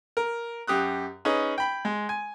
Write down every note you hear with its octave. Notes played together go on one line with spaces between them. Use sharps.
A#4
F#2 G4 D#6 F#6
C#4 D#4 G#4 B4
G5 B5
G#3
G#5